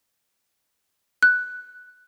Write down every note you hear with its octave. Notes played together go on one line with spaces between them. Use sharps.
F#6